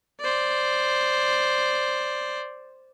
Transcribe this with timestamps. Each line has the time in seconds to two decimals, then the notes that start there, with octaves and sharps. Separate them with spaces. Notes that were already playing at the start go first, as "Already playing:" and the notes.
0.20 C5 D5